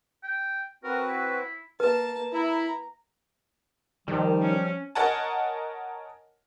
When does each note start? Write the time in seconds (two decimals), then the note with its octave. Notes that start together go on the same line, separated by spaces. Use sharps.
0.23 G5
0.84 C4 F#4 A#4 B4
1.09 E4
1.80 A#3 B4 A5
2.33 E4 A#5
4.08 D#3 F3 G3
4.41 C#4
4.95 A#4 C#5 D#5 F#5 G#5 A5